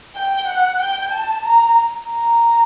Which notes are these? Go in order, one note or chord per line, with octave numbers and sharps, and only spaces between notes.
G5
F#5
G5
A5
A#5
A#5